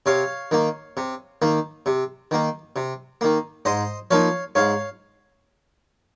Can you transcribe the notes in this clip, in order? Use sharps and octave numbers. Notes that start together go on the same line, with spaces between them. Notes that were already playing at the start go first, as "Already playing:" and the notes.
C3 C#5 F5
D#3 A#3
C3
D#3 A#3
C3
D#3 A#3
C3
D#3 A#3
G#2 C5 D#5
F3 A#3 D#4 C#5 F5
G#2 C#5 F5